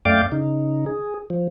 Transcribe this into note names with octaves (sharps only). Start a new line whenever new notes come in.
F#2 A3 D5 F5 G5 D6
C#3 D#4
G#4
F3